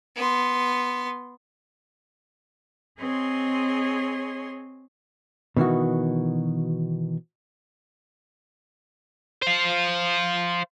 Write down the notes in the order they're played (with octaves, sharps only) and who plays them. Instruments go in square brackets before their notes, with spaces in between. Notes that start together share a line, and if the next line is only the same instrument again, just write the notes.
[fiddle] B3 C6
[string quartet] C4 G#4 C#5 D#5 C6
[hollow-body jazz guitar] B2 D#3 E3 F#4
[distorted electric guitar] C5 F5